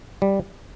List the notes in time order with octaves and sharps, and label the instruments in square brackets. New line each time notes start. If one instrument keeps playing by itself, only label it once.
[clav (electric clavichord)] G3